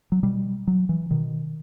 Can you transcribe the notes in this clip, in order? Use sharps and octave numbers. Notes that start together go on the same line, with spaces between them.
F#3
B2 G3
F#3
E3
B2 D#3